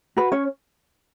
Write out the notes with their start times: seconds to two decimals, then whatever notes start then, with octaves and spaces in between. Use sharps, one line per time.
0.17 F#4 B4
0.32 C#4 C#5